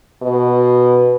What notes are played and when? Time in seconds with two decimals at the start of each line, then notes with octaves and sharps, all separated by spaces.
0.23 B2